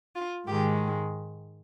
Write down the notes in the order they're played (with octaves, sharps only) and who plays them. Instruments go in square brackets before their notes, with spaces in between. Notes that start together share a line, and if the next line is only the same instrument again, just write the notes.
[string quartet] F4
G#2 D#3 G#3 G4